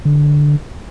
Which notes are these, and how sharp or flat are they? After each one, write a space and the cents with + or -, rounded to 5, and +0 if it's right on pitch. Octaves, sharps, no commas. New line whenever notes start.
D3 +0